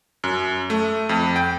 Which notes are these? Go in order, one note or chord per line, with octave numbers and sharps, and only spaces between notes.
F#2
A3
F2
G5